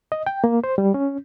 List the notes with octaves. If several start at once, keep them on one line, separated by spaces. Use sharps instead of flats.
D#5
G5
A#3
C5
G3
C#4